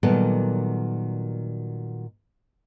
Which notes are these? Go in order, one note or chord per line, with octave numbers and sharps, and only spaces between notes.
A#2 D#3 F#3 G3 B3 A4